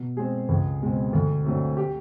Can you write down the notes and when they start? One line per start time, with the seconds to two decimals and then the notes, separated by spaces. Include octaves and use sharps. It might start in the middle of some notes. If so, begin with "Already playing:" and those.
Already playing: B2
0.17 G#3 C4 G#4
0.49 C#2
0.81 B2 G#3 C4
1.13 D2
1.45 D3 F#3 A3 C4
1.77 G4